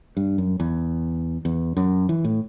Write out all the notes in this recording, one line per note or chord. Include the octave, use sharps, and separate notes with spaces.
G2
F#2
E2
E2
F#2
E3
A2